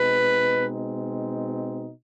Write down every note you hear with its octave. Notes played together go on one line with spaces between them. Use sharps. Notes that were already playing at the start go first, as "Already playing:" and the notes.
Already playing: B2 G#3 C4 D#4 B4